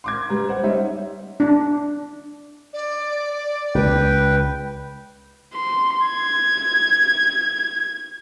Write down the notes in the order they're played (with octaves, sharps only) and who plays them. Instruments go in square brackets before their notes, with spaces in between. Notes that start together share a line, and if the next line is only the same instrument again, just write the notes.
[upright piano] C6 D6 G#6
G3 B4 A#5
C5 F#5
G3 C#4 D#4 C5 E5
[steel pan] D4
[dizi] D5
[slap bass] C#2 [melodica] B4 G5
[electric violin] C6
G#6